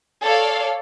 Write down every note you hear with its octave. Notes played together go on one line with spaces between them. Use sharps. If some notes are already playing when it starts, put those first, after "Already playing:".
A4 C#5 D5 F5